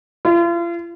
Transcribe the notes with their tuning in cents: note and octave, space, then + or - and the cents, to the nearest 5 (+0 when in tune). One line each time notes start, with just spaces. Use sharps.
F4 -40